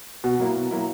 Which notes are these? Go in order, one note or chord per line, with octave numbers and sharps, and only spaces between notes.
B2 F#4
F#3 A#3 E4
B2
F#3 A#3 E4